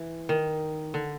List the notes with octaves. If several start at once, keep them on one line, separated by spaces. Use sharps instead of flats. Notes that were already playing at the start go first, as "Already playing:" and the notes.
Already playing: E3
D#3
D3